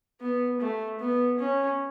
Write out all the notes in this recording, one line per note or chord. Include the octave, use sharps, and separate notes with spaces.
B3
A3
B3
C#4